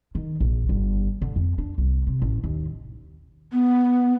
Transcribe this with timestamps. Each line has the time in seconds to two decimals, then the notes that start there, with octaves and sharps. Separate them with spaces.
0.15 D#3
0.40 A#1
0.69 G1
1.22 D3
1.36 F2
1.58 D4
1.78 C2
2.07 C3
2.22 A1
2.44 D#2
3.53 B3